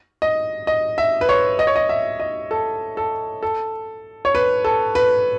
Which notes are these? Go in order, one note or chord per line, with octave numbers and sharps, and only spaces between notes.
D#5
D#5
E5
B4
C#5
D#5
C#5
D#5
E5
D#5
A4
A4
A4
C#5
B4
A4
B4